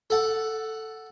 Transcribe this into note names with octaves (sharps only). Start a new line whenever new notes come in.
A4 F#5